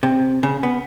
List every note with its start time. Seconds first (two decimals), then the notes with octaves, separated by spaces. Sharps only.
0.03 C3
0.43 C#3
0.63 B3